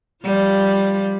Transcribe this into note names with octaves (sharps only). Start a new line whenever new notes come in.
F3 G3 F4